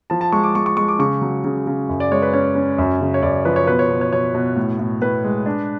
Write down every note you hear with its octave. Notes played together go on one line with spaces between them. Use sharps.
F3 A5
A5
G#3 C#6
D6
G#3 C#6
C#6
G#3 C#6
D6
C#3 C#6
F#3
C#3
C#3
F#2
D5
G#3 C#5
B4
C#4 C#5
C#4
F#2
C#3
C#5
F#2 D5
F3 B4
C#5
B2 B4
C#5
B2
C#5
B2 C#5
B2
A2
A2
A2 B4
G#3
D4